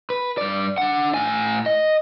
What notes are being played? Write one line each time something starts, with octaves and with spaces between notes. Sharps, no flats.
B4
G2 D5
D4 F#5
A2 G#5
D#5